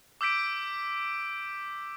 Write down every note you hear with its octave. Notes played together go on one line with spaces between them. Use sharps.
D6 E6 G6 B6 D7